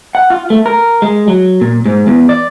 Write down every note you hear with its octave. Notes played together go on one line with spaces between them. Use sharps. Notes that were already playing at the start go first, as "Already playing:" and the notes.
F#5
F4
A3
A#4
G#3
F#3
A#2
G#2
E2
D5